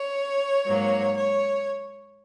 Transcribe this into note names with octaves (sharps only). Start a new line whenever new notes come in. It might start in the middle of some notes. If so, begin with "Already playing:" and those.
Already playing: C#5
G#2 F#3 A#3
C#5